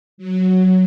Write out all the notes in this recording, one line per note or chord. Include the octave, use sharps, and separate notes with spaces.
F#3